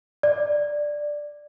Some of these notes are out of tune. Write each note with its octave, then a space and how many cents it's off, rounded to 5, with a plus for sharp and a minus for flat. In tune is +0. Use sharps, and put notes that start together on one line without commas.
D5 +5